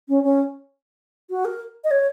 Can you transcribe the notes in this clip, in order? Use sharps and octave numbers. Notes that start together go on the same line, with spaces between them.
C#4
C#4
F#4
A#4
D#5
C#5